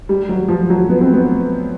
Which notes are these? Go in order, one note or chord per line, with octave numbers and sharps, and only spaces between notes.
G3
F#3
F3
F#3
B3
C4
B3